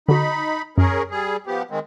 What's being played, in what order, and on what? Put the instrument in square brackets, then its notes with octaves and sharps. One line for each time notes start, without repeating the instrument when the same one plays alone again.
[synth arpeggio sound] D3 F#4 [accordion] D#4 B5
[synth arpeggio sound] F#2 [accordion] C#4 G#4 A#4
[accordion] G3 G#4
F3 B3 G4
D#3 G#3 C4